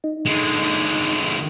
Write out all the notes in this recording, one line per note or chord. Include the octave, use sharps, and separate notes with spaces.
D#4
D3 G#3